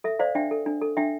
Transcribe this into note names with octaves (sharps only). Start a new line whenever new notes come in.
A4 E5
C5 D5 F5
D4 E5 G5
A4
D4
A4
D4 E5 G5